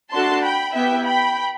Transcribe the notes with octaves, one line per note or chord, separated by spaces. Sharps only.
A3 D4 F#4 A4 A5 C6
G5 B5
B3 E4 G4 E5 G5
G5 B5